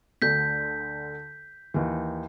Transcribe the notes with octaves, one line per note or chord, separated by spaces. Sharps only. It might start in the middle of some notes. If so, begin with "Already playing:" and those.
D2 D3 G6 B6
D#2 E3